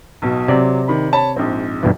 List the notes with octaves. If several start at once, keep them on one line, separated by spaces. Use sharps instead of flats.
B1 B2
C3 F#3 D5
D#3 B5
C#5 A5 B5
A#1 G#2 C4
G2 B2 E3